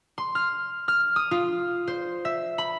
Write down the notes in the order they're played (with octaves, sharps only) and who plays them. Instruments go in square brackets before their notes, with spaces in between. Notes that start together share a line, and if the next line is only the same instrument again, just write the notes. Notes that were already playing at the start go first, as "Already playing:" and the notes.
[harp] C6
F6
F6
D#6
F4
C5
E5
B5